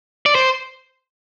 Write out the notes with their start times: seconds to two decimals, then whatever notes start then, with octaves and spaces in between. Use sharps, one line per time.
0.26 D5
0.35 C5